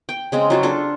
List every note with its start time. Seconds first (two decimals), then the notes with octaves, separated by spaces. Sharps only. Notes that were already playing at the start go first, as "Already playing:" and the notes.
0.09 G5
0.32 C#3 G#3 C4
0.50 F#3 F4 F#4
0.63 D4 F4 A4